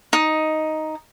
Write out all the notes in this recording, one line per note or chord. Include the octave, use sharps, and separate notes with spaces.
D#4